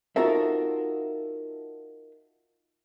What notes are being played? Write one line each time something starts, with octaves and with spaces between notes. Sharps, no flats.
D#4 F4 F#4 A4 A#4 E5